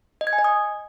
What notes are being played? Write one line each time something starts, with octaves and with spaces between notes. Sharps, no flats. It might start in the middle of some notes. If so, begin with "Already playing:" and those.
D#5
G#6
G#5
D#5
D#6